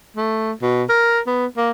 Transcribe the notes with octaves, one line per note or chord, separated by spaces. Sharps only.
A3
B2
A#4
B3
A#3